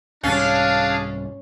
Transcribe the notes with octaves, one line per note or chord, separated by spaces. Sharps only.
C2 G#2 G3 C#4 D4 G#4 F5 A5